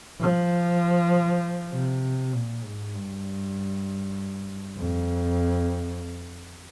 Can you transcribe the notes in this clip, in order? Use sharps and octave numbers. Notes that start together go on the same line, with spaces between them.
F3
C3
A#2
G#2
G2
F2